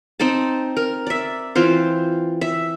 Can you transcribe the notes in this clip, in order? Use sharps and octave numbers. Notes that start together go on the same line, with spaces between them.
C4 D#4 D#5 A5
A#4
D5 E5
E3 C4 F4 C5
E5